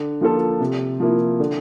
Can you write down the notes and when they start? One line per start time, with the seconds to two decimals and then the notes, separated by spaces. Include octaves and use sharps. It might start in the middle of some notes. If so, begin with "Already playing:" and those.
Already playing: D3
0.21 F3 A#3 F4 A4
0.60 C3
1.00 F3 A#3 E4
1.40 D3